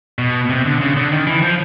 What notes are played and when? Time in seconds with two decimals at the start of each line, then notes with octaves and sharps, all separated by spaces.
0.19 B2
0.49 C3
0.66 D3
0.81 C#3
0.96 D3
1.12 D#3
1.27 E3
1.43 F3